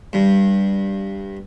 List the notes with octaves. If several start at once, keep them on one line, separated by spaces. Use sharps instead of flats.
G2